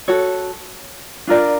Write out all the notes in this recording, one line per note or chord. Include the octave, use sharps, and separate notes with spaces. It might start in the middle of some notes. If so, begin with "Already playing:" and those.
F#4 A4 C#5
D4 F4 A#4 D5